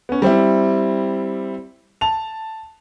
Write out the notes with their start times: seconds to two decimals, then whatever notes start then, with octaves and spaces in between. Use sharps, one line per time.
0.09 B3 C#4
0.22 G3 C4 E4
2.01 A5 F7